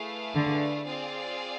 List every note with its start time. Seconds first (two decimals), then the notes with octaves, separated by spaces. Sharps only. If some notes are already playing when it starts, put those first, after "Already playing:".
Already playing: A3 E4 G#4 B4 F5
0.35 D3
0.86 C4 F4 G#4 D5 F5